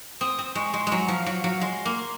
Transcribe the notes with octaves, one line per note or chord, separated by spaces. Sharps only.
C4 D#6
C4
G#3 C#6
G#3 C6
G#3
F#3 A#5
F3 F5
F#3 F5
F#3 F5
G#3 C6
A#3